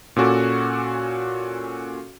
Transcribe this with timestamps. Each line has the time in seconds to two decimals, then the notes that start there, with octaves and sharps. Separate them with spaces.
0.16 A#2 C#4 F#4 A4 D6